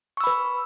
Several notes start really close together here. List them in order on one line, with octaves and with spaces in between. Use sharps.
C#6 E6 B5 B4